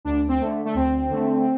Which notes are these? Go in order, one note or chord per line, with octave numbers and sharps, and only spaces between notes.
D2 D4
C4
D3 A3
A3
D2 C4
D3 A3